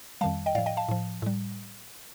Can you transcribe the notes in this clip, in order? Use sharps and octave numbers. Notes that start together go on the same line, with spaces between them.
F2 D#3 G3 F5 A5
D#5 G5
A2 F3 D5 F5
D#5 G5
F5 A5
A2 F3
A2 G3